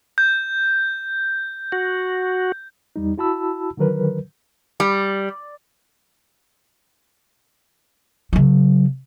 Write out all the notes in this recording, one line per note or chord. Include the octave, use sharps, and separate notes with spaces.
G6
F#4
E2 G3 D#4
E4 F#4 A5 B5 E6
D3 D#3 F#3 A#4 B4
G3
C#3 F#3